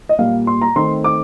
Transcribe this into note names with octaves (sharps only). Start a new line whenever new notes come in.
D#5
A#2 G3 A#3 F5
C6
A#5
D#3 A3 C4 C6
D6